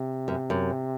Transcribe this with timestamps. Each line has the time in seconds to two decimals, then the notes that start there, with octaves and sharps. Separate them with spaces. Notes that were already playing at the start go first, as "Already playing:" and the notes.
Already playing: C3
0.28 F#2
0.50 F#2